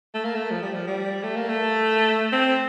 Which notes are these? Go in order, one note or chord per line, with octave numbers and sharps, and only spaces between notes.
A3
A#3
A3
F3
G3
F3
G3
A3
A#3
A3
C4